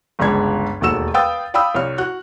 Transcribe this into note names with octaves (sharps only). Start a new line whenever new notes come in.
G1 C#2 G#3 D4 G#6
E1 D#2 A3 F#4 E6 E7
B4 F5 G5 D#6 E6 A6
D5 F5 G5 B5 D#6 E6
C2 C#5 F6
F#4 F#6